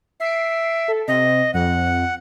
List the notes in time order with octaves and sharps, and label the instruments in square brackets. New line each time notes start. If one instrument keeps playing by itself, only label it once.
[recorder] E5 [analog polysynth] C7 D7
[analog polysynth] A4
[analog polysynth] C3 [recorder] D#5
[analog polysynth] F2 [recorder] F#5